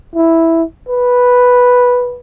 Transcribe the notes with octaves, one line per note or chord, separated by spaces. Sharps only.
E4
B4